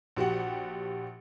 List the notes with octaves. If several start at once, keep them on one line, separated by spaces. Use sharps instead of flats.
A#1 F#4 G4 F#5